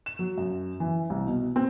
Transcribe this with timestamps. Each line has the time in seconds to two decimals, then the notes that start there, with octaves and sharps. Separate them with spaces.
0.06 E7
0.19 F#3
0.38 F#2
0.80 E3
1.10 C2
1.27 B2
1.56 C4